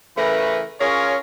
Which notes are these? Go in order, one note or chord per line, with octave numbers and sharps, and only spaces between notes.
C#3 E3 A3 A#4 B4
C#4 F4 G#4 A#4 C#5